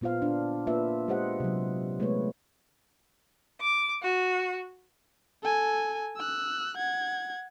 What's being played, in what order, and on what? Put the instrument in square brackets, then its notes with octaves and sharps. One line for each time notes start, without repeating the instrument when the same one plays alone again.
[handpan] A#2 B3 F4 C5 F5
D4
A#3 F4 B4 E5
G#3 G4 C5 D#5 F#5
C3 F#3
G#3 A3 B3 B4 C#5
[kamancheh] D6
F#4
[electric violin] A4 G#5
E6 F#6
F#5 G#6